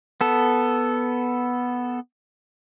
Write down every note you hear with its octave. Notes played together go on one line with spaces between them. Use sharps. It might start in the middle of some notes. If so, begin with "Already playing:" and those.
B3 A4